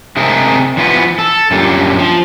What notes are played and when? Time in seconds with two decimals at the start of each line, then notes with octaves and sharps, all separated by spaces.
0.17 C3 G#3 A3 C4 G#4 A#4
0.77 E3 F3 B3 F4 A#4 B4
1.19 A4
1.51 F#2 A#2 D3 G3
1.99 F3